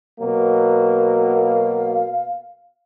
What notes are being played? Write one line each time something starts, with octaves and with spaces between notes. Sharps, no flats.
B2 F#3 A#3
F5